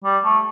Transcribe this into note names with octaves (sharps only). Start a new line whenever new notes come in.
G3
A3